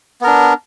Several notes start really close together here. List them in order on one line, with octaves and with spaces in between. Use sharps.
B3 A#4 D4